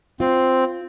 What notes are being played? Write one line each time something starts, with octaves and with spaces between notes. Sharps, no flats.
C4 F4